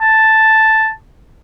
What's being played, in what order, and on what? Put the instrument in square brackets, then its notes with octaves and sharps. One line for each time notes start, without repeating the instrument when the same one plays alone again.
[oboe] A5